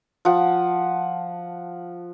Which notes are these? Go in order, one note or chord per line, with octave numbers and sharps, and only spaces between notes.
F3 F#5